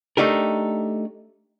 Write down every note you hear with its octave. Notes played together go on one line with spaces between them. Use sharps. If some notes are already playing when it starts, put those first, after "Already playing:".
A3 D4 D#4 G4 A#4